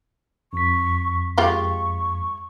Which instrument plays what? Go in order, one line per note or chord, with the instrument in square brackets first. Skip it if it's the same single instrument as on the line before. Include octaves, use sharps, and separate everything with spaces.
[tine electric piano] F2 B6 [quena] C#6
[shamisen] G#3 F4 G4 [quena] C#6